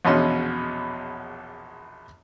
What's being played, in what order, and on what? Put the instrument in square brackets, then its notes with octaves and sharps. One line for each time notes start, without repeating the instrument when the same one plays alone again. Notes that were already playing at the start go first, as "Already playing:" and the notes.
[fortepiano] A#1 E2 B2 C#4 D#5 C6